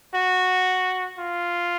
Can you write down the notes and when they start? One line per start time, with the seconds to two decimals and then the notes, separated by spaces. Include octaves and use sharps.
0.15 F#4
1.19 F4